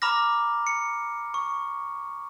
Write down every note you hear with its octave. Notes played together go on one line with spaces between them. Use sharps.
A#5 B5 D6 F6 A#6
C#7
C#6